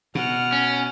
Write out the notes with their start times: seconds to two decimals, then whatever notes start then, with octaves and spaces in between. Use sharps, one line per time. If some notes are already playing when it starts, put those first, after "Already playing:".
0.15 B2 F#5 F6
0.53 C#4